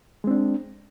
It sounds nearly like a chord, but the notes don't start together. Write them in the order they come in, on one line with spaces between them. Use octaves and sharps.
G#3 C4 D4